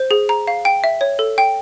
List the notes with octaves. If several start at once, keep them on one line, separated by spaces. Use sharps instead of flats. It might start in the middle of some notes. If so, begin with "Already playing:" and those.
Already playing: C5
G#4
A#5
F5
G5
E5
C#5
A4
G5